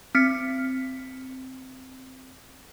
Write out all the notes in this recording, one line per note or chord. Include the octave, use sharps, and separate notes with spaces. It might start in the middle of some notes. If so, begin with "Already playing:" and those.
C4 B6 C#7